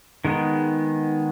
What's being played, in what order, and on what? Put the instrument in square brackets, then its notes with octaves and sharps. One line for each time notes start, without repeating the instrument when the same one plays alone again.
[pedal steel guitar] D#3 G#3 B3